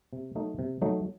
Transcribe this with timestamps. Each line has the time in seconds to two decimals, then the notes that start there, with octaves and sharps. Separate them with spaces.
0.13 C3
0.35 F#3 A3 D#4
0.59 C3
0.82 F#3 A3 D#4